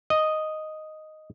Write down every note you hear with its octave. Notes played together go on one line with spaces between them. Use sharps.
D#5